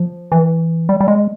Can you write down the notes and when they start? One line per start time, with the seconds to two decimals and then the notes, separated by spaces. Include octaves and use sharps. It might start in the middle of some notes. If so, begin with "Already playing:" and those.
Already playing: F3
0.32 E3
0.89 G3
1.00 G3
1.08 G#3